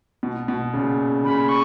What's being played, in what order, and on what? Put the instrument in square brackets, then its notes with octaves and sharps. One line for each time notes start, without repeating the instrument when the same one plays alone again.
[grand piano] B2
B2
A#2 C#3
[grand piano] A#2 C#3 [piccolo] B5
[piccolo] C#6